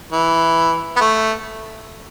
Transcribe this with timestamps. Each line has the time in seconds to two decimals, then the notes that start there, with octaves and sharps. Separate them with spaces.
0.12 E3
0.96 B3
1.01 A3